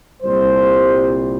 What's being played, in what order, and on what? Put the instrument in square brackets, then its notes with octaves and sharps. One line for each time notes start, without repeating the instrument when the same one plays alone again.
[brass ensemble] C2 A#2 G3 C5